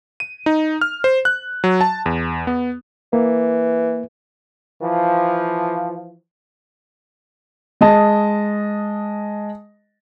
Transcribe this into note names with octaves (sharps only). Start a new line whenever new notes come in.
D#7
D#4
F6
C5
F#6
F#3
A5
E2
B3
E3 A#3
E3 F3
G#3 D#5 A5